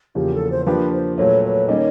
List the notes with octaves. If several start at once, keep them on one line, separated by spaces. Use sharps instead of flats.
E2 C#3 F3 A#3 G4
A4
C5
F3 A#3 D4 G4 B4
C5
A#2 F#3 A3 B4 C#5
B4 C#5
D#3 G3 A#3 C#4 C#5 D#5